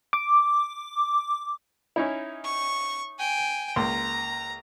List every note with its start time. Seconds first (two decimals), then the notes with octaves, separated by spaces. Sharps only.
0.13 D6
1.96 C#4 D#4 E4
2.44 C#6
3.19 G5 G#5
3.76 C#2 A#3 A#5 C6